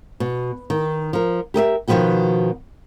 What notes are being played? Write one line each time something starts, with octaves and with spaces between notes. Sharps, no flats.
B2
D#3
F3 A#4
G4 A#4 D#5 E5
B2 D#3 F3 B3 F#4 G5